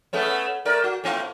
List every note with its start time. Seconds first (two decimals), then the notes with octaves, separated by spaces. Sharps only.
0.13 A3 B3 C#4
0.65 A3 A#4 D5
0.84 F#4
1.04 A2 B3 F4